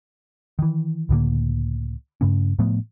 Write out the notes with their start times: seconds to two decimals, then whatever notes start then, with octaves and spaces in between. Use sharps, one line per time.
0.59 D#3 E3
1.09 C#2 A2 D3 A#3
2.21 G2 C#3 A3 C#4
2.59 A2 F3 A3 B3